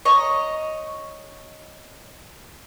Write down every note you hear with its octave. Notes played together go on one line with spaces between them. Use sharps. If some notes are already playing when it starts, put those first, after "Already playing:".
C#5 D#5 A#5